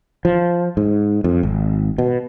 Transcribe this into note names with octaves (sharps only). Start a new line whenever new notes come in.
F3
G#2
F2
G#1
B2